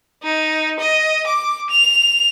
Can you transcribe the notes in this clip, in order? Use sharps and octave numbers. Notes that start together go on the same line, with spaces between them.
D#4
D#5
D6
F7